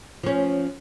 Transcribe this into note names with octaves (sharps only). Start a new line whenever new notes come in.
F3 C#4